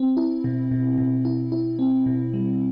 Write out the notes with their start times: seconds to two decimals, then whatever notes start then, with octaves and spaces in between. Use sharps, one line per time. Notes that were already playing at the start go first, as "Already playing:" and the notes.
Already playing: C4
0.17 E4
0.44 B2
0.71 B2
0.98 B2
1.25 E4
1.52 E4
1.79 C4
2.06 B2
2.34 G3